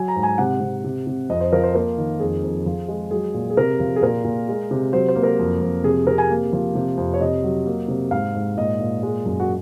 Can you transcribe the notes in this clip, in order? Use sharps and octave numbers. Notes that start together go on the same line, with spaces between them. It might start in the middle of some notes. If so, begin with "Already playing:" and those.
Already playing: F#3 G#5
A#5
G#2
G#5
C3 F#5
C3
C3
C3
F2 D#5
C5
F3 A#4
C5
A#3 A#4
D#3
F2 G#4
F2
F3
G#3
F#3 G#4
A#2
G#4
C3 A#4
F3
G#4
A#2 A#4
A#2
G#3
C3
F#3 C5
C5
A#3
A#4
F2
F2
C3 G#4
C3 A#4
G#5
A#3
F3
C3
F2
C#5
C3 D#5
F#3
A#3
C3
G#2 F5
G#2
A#2 D#5
A#2
G#3
F#2
F#4